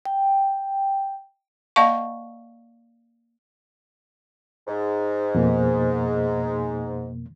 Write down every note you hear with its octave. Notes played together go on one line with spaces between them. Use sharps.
G5
A#3 D5 D#5 F5 A5 C#6
G#2
F2 B2 A#3